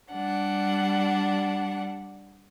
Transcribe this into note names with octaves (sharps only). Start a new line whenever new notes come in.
G3 D4 F#5